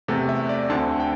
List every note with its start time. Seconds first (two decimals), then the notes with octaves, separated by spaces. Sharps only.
0.08 E2 C3 A3 A4
0.29 E5
0.49 D5
0.70 D2 D3 A3 C4 A5
1.00 G5